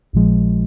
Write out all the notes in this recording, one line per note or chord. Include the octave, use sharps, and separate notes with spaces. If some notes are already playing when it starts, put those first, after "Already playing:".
A#1 A#2 F3 G#3